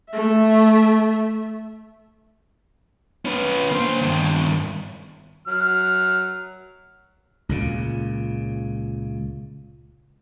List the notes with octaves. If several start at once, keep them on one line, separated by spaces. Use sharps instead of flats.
A3 E5
C#4 B4
A#3 C5
G2 D#3
F#3 F6
C#2 A#2 C#3